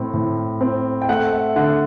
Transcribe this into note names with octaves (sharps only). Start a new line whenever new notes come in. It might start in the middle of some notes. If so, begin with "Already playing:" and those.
Already playing: A2 C4
A2
C4
G5
A3 F#5
E5
D3 F#5